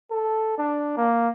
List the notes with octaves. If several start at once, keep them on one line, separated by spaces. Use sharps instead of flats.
A4
D4
A#3